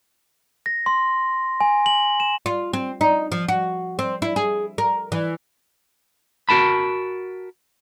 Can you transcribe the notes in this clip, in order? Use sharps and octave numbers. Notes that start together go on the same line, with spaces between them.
A#6
C6
G#5
F#7
E7
F4
C4
D#4
F3
F#4
C4
E4
G#4
A#4
E3
F#4 A#4 A5 B5